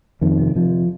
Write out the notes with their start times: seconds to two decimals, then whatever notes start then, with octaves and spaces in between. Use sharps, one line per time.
0.21 F2 D#3
0.39 C3
0.56 C3 F3